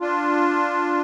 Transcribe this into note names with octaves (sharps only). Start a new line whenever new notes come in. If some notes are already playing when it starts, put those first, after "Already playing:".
D4 F4